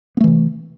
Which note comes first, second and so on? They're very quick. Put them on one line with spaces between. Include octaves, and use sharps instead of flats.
B3 A3 E3 C3